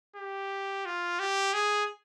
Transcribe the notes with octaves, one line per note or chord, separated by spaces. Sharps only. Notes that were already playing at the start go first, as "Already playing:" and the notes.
G4
F4
G4
G#4